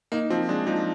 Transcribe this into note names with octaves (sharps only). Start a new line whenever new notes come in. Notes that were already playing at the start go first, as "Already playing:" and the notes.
A#3 D#4
F3 C4
G#3 D4
F3 D#4